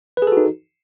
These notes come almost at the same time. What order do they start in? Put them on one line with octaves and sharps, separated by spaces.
B4 G#4 A4 F#4 D#4